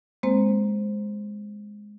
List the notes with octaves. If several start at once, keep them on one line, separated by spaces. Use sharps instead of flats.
G#3 A#3 C4 C5